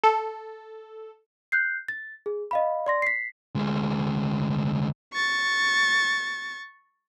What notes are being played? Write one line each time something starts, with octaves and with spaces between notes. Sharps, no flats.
A4
F#6 G6 C7
A6
G#4
D#5 F5 B5
D5 C6 A#6
B6 C7
D2 G#3
C#6 A6